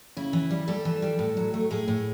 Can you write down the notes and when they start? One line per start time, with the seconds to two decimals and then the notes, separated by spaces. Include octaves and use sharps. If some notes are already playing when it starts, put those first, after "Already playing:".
0.17 C#3 E4
0.33 E3
0.50 G3
0.68 G3 A4
0.85 E3
1.02 G3
1.19 A2
1.37 F#3
1.54 A3
1.71 A2 G#4
1.88 A2